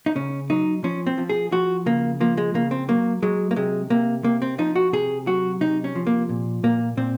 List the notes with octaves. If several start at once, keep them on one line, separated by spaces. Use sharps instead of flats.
D#4
C#3 C#4
F#3 D#4
F3 C#4
C4
F3
G#4
F3 F#4
C#3 A#3
F3 A#3
G#3
C#3 A#3
C4
F#3 A#3
F#3 G#3
A#3
C3 G#3
C3 A#3
C3 A#3
C4
F3 D#4
F#4
C3 G#4
F#3 F#4
C3 D#4
C#4
F3
A#3
A#2
A#2 A#3
A#2 C4